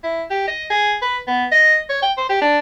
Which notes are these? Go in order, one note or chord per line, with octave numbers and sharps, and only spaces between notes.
E4
G4
D#5
G#4
B4
B3
D#5
C#5
G5
C5
G4
D4